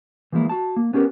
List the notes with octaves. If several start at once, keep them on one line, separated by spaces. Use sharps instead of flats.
E3 F3 G#3 A#3 E4
F#4 A5
A#3
B3 C#4 G4 A#4